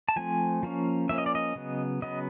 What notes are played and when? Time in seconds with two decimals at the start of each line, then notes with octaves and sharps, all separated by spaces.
0.09 A5
0.16 F3 A3 C4 G#5
0.63 F3 A#3 C#4
1.09 F3 A#3 C#4 E5
1.18 D#5
1.26 D5
1.35 D#5
1.56 C#3 F#3 B3
2.02 C#3 F#3 B3 D#5